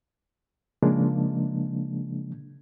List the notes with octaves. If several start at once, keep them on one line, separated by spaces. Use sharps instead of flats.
C#3 F3 G#3 A#3 D4